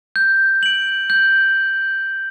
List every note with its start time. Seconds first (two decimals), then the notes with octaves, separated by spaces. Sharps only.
0.16 G6
0.63 D7 F#7
1.10 G6